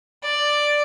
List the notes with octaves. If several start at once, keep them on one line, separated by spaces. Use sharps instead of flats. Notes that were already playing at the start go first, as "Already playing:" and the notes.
D5